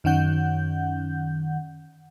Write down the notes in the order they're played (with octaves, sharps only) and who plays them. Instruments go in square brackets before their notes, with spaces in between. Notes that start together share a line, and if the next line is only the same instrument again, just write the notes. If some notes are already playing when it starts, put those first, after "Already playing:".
[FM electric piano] F#2 D#3 C#4 F#5 G6